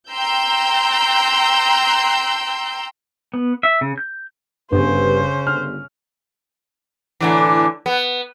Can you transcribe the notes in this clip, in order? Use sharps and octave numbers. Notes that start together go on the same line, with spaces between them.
G5 A#5 C6 E6 G6
B3
E5
C#3
G6
G1 C#3 G3 C#4 G4 B4 C5
G1 F6
A2 D3 E3
B3